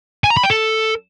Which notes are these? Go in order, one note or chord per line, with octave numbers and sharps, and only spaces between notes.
G#5
A#5
B5
G5
A4